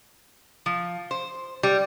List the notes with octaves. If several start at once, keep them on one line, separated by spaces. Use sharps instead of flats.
F3
C5
G3